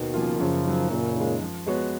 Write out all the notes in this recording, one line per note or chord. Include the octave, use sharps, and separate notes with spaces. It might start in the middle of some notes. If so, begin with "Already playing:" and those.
Already playing: D#2 B2 D#3
C#3 F3 A#3 F4
F#2 C#3 F3
D#3 F#3
F#2 A#2 C#3
D#3 G#3
F3
G#3 B3 F#4 C#5